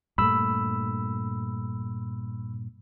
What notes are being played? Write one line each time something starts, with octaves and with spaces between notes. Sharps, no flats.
G2 A#2 A3 B5 E6